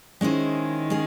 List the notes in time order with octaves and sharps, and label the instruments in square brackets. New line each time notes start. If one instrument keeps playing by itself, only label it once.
[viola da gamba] D#3 [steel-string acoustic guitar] G#3 C#4 E4 G#4 C5
[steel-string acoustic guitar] G#3 C#4 G#4